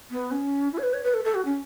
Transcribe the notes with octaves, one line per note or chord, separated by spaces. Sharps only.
B3
C#4
E4
C#5
B4
C#5
B4
A4
A4
F#4
C#4